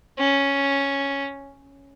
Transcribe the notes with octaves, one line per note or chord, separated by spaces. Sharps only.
C#4